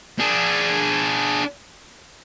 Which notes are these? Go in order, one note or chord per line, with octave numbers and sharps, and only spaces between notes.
D4 G#4